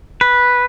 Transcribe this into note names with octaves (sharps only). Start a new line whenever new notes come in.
B4